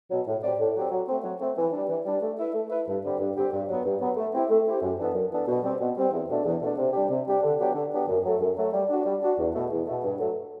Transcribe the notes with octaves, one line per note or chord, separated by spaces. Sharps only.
B2 F#3
A2
F#3 C4 G4 D5
A2
F#3 C4 G4 D5
F#3
A3 C4
F#3
A3 C4
E3
G3 D4
E3
G3 D4
A3
E4 B4 E5
A3
E4 B4 E5
G2
D3 G3 C4 G4
G2
D3 G3 C4 G4
G2
F#3 B3
G2
F#3 B3
A3
C4 E4 G4
A3
C4 E4 G4
F#2
E3 B3 D4 A4
F#2
E3 B3 D4 A4
B2
G3 C4
B2
G3 C4
E2
B2 A3 D4
E2
B2 A3 D4
C3
G3 D4 G4
C3
G3 D4 G4
D3
F#3 B3 D4 G4
D3
F#3 B3 D4 G4
F#2
F#3 A3
F#2
F#3 A3
G3
D4 F#4
G3
D4 F#4
E2
B2 A3
E2
B2 A3
G2
F#3 A3